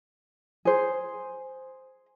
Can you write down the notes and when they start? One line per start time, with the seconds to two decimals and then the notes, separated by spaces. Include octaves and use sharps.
0.65 G#4 C5